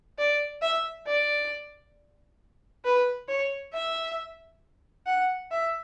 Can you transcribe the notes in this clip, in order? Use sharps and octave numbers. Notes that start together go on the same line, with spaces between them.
D5
E5
D5
B4
C#5
E5
F#5
E5